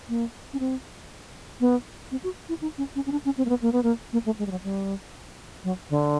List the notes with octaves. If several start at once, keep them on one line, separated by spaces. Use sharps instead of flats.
A#3
C#4
C4
B3
C4
F#4
E4
D#4
C#4
C#4
C#4
D4
C#4
C4
A#3
B3
A#3
B3
A#3
A#3
A3
G#3
G3
F#3
G3
F#3
D3